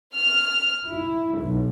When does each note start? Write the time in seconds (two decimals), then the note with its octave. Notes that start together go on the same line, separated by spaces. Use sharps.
0.15 F6
0.85 E4
1.39 B1